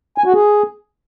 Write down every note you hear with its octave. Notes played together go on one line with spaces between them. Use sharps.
G#5
F#4
G#4